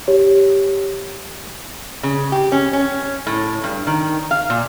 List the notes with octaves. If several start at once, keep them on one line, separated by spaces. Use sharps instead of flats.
G4 C#5
C#3
G4
C#4
C#4
A2
G2
D#3
F5
A#2